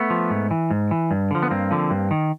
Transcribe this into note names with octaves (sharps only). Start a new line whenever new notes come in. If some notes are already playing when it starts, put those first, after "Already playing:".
Already playing: A3 B3
F3
G#2
E3
G#2
E3
G2
D3 F3
B3
G2 A#3 C4
D3 F3
G2
D#3